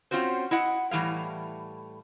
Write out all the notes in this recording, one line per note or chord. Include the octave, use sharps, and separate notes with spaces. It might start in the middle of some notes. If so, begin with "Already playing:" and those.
C4 C#4 F4 F#4 C5
E4 D#5 F#5
A2 E3 G3 F5